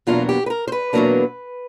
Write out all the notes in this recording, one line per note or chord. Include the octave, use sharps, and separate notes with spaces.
E2 B2 F#3 A#3 D4 F4
G4
B4
A#4
C5
B4
E2 B2 F#3 A#3 D4